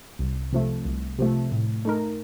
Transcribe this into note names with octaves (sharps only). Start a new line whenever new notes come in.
C2
C3 F3 A3
C2
C3 F3 A3
A2
A3 D#4 A#4